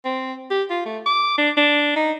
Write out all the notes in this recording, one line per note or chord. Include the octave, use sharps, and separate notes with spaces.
C4
G4
F4
A3
D6
D4
D4
D#4